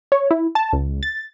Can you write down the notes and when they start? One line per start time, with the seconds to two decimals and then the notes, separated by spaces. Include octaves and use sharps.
0.12 C#5
0.31 E4
0.55 A5
0.73 C#2
1.03 A6